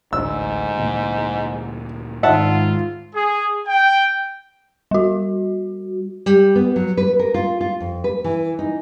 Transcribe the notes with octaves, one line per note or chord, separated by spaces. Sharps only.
A1 D2 G#2 E6
D2 A#2 E3
G#2 D#3 G#3 F4 E5 F#5 A5
G#4
G5
G3 F#4
G3
B3
F#3
B4
A#4
F4
F4
F2
B4
E3
D#4